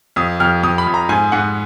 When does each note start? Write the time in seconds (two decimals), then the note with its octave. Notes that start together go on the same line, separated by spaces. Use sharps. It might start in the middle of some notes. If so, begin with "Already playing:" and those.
0.16 F2 D#6
0.40 F2 F6
0.63 F2 D#6
0.78 B5
0.87 F2
0.94 A#5
1.09 G#2 G#5
1.32 G#2 F#5